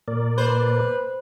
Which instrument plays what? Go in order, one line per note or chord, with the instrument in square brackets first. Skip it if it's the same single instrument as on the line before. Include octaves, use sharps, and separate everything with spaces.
[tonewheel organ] A#2 A#4 D5
[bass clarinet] B4 [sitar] C5